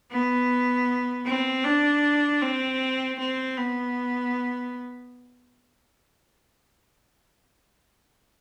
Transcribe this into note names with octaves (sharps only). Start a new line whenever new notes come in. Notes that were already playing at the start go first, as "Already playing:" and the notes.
B3
C4
D4
C4
C4
B3